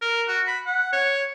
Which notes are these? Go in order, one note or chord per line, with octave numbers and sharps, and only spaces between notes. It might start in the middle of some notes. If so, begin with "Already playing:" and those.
A#4
F#4
B5
F#5
C#5